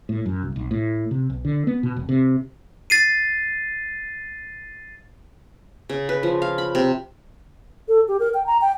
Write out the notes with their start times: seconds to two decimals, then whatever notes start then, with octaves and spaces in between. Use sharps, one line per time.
0.09 A2
0.26 F#2
0.42 C2
0.56 B1
0.71 A2
1.11 C3
1.30 B1
1.45 D3
1.67 B3
1.83 B2
1.96 F1
2.09 C3
2.90 A6 C7 D#7
5.89 C#3
6.09 B4
6.23 F3
6.42 F5
6.58 B5
6.75 C3
7.88 A4
8.08 G4
8.20 A#4
8.34 G5
8.46 A#5
8.61 G5